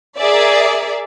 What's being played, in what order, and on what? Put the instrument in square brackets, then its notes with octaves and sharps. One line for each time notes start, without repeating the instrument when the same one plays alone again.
[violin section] G#4 A#4 D5 E5